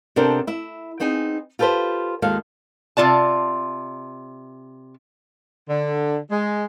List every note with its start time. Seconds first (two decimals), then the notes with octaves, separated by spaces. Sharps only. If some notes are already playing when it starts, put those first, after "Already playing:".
0.16 C3 B3 D4 A4 A#4 C5
0.47 E4 E5
1.00 B3 C4 D#4 G#4 G#5
1.59 F4 G4 A4 B4 C5
2.22 D#2 G#3 F4 A4 F5
2.97 C3 C4 F4 D5 A5
5.69 D3
6.31 G#3